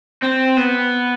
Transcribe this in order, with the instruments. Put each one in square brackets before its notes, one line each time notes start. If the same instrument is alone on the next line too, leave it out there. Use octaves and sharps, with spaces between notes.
[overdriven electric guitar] C4
B3